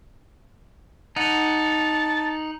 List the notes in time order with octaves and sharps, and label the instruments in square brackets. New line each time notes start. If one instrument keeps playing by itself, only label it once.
[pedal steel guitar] D#4 F#5 [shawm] A5